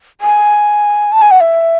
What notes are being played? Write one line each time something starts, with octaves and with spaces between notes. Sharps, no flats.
G#5
A5
G#5
F#5
E5